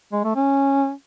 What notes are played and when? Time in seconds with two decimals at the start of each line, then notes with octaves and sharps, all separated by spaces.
0.13 G#3
0.24 A3
0.36 C#4